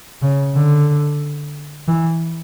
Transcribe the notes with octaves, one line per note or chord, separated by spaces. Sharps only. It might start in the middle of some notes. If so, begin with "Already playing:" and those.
C#3
D3
E3